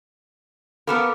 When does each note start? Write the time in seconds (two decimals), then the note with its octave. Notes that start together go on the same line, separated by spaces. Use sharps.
0.87 B3 A4 A#4 F5 B5 D6